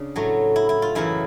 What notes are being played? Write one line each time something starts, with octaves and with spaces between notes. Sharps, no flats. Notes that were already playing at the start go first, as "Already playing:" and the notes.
Already playing: C#3 D4
A2 F#3 A3
E4
E4
F4
F#2 C#3 E3 E4